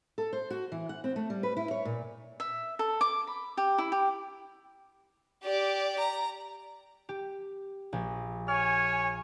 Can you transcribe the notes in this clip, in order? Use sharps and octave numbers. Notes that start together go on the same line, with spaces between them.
A4
C5
F#4
E3
F#5
C4
A3
G3
B4
E4
C#5
A#2
E5
A4
D6
B5
G4
E4
G4
G4 D5
A#5
G4
A#1
C#5 G#5 F6